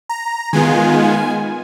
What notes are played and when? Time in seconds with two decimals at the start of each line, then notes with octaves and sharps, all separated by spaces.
0.09 A#5
0.53 D#3 G#3 B3 F4 G#5